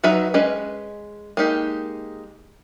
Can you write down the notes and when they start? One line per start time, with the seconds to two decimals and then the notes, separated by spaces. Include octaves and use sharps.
0.04 F#3 D#4 B4 E5 A#5
0.34 G#3 C#4 B4 D#5
1.37 G#3 A#3 D#4 G4